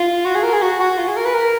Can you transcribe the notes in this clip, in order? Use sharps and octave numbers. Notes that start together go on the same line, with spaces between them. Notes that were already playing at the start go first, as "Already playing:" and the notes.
Already playing: F4
F#4
G#4
A#4
G#4
F#4
F#4
F4
G#4
A#4
B4
A#4